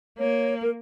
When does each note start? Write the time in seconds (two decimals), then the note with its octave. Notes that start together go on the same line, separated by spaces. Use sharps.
0.19 A#3 C#5
0.62 A#4